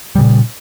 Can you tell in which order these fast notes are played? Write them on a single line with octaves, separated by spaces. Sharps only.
G3 C#3 A#2